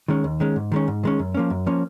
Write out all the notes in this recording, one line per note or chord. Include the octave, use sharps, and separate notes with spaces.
D#3 G#3 C#4
D#2
D#3 G#3 C#4
G#2
D#3 G#3 C#4
G#2
D#3 G#3 C#4
F#2
F3 A#3 C#4
F#2
F3 A#3 C#4